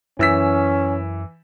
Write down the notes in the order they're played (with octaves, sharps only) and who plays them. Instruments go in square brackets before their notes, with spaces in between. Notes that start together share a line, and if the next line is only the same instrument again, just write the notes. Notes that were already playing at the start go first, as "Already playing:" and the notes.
[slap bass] F#2 [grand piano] E3 E6 B6 [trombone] C#4